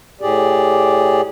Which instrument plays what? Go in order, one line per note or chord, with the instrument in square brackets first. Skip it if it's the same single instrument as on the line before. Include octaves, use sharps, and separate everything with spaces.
[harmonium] A2 G4 G#4 D5